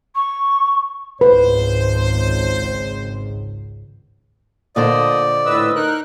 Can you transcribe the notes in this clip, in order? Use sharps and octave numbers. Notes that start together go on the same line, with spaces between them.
C#6
G#1 C#2 B4 C5
A#2 D3 C5 D5 D#5
A2 B4 D#5 E6
D#4 A#4 F#6